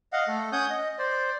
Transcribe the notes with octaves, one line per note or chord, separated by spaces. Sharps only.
D#5 F5 F#5
A3 A4
C#4 C#5 F#5 D#6 G6
D#5
C5 D5